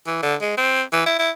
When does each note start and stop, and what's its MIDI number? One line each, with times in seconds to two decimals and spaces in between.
0.07 0.20 52
0.23 0.35 50
0.42 0.56 56
0.57 0.82 60
0.93 1.02 52
1.06 1.14 64
1.19 1.31 64